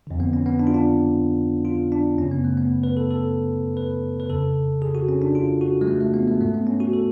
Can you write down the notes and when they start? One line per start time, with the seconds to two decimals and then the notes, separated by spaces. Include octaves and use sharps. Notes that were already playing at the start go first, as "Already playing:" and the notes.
0.07 F2 D3
0.20 B3
0.33 C#4
0.46 B3
0.59 D4
0.67 F4
0.74 D4
1.65 F4
1.92 D4
2.18 F#2 C#3 C#4
2.31 B3
2.44 A3
2.57 B3
2.83 B4
2.97 A4
3.11 A4
3.77 B4
4.20 B4
4.29 F2 C#3 A4
4.82 G#4
4.95 F#4
5.09 C#4
5.22 D4
5.35 F4
5.61 F#4
5.81 G#3
5.88 A3
6.01 A3
6.14 B3
6.28 A3
6.41 G#2 A3
6.54 B3
6.67 C#4
6.80 F#4
6.93 A4